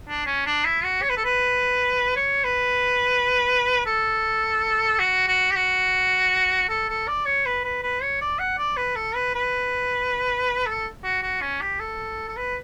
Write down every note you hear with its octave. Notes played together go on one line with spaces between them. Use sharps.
D4
C#4
D4
E4
F#4
C#5
B4
A4
B4
C#5
B4
A4
F#4
F#4
G4
F#4
A4
A4
D5
C#5
B4
B4
B4
C#5
D5
F#5
D5
B4
A4
B4
B4
A4
F#4
F#4
C#4
G4
A4
A4
B4